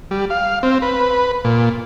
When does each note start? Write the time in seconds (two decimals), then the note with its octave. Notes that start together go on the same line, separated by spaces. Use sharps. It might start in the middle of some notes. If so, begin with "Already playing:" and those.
0.11 G3
0.30 F5
0.63 C4
0.82 B4
1.44 A#2